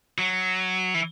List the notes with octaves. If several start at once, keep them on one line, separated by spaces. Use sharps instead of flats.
F#3
E3